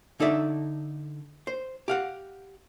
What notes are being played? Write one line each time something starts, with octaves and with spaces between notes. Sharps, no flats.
D3 D#4 A4 D5 E5
C5
G4 F5 F#5